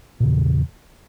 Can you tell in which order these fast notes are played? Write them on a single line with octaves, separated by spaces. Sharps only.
A#2 C#3 E2 E3